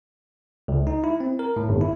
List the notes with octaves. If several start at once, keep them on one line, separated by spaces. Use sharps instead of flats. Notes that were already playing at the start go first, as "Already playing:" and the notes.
C#2
D#4
E4
C4
A#4
A2
G1
E4